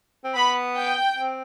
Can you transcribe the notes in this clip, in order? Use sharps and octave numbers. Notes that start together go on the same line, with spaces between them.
C4
B3 B5
G5
C4